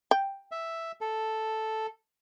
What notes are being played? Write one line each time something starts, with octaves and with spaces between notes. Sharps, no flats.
G5
E5
A4